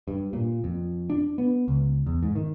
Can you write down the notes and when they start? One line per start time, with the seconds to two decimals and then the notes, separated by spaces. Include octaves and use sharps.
0.08 G2
0.33 A#2
0.64 F2
1.10 D4
1.38 B3
1.68 C#2
2.06 E2
2.23 G#2
2.35 D#3